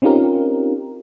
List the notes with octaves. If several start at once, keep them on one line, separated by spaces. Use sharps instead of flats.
C4 C#4 D#4 F4 G4 A#4